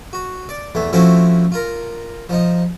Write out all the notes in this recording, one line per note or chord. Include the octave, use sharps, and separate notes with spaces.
F#4
D5
E2 A3
F3 A3 C4 C#4 E4 F#4
F4 A#4
F3 D#4